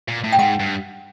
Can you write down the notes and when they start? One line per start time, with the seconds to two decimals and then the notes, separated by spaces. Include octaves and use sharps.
0.08 A#2
0.24 A2
0.33 G5
0.39 G#2 F#5
0.60 G2